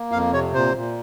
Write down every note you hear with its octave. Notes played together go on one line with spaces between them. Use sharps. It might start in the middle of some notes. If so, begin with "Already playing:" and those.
Already playing: A#3
F2 F5
C3 C#5
A#2 C5
A#2